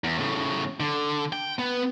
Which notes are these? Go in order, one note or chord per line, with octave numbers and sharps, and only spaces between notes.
E2
A2 C#3
D3
G5
B3